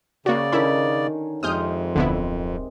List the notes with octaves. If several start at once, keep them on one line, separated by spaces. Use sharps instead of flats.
C#3 A#3 F#4 D5
D3 D#3 C#4 E4 B5
F2 C3 G#3 D#6 F6 G6
D1 D3 B3 E4